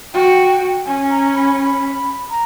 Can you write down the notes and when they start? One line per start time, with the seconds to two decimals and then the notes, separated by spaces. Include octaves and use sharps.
0.14 F#4 G5
0.86 C#4 G#5
1.10 A#5
1.35 B5
1.59 B5
2.30 A#5